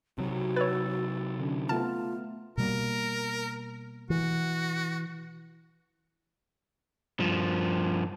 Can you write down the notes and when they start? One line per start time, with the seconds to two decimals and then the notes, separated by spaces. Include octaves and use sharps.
0.18 C3 F#3 F#4
0.56 B4 C#5 E6 A6
1.39 D3 C#4 D4
1.69 A3 B3 F4 A5 F6
2.58 B2 G3 A#3 A#4
4.10 E3 F#4
7.20 G2 F3